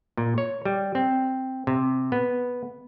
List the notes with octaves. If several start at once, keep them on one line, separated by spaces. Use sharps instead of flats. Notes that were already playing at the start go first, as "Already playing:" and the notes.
A#2
C#5
G3
C4
C3
B3